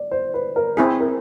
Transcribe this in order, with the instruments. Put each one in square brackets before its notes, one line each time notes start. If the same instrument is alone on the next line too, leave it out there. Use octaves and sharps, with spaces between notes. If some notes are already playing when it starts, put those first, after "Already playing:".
Already playing: [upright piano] D5
C5
B4
A#4
[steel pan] C4 E4 G#4
[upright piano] A#4